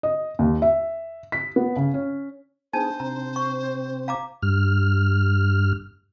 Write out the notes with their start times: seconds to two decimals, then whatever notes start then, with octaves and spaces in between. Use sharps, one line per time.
0.03 D#5
0.39 D#2
0.62 E5
1.32 B6
1.56 B3
1.76 C#3
1.94 C#4
2.73 B3 D4 D#4 G#4 C5 A5
3.00 C3 C4 A#5
3.36 C#6
4.08 F5 A#5 D6
4.43 G2 F6